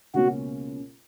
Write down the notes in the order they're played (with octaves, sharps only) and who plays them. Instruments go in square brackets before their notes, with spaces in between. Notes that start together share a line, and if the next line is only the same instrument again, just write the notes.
[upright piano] C#2 B2 A#3 C#4 [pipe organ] F#4